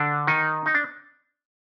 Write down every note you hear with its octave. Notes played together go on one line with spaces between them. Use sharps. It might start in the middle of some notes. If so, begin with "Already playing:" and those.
Already playing: D3 D4
D#3 D#4
D#4
D4